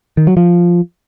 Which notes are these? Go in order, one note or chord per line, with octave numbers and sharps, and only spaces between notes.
D#3
F#3
F3